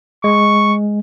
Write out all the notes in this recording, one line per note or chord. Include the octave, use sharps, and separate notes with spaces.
G#3 C#6